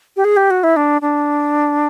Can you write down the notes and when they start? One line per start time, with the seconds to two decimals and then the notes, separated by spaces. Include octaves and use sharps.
0.17 G4
0.25 G#4
0.37 G4
0.51 F#4
0.64 E4
0.76 D4
1.02 D4